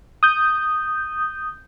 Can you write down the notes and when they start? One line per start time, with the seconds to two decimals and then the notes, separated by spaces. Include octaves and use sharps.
0.23 D#6 G6